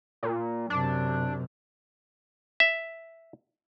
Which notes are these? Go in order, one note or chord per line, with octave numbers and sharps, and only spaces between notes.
A#2
F#2 C3 D4
E5